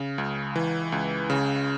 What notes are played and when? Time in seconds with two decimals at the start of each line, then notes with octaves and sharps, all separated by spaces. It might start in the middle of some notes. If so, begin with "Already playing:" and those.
Already playing: C#3
0.18 C#2
0.56 E3
0.92 C#2
1.30 C#3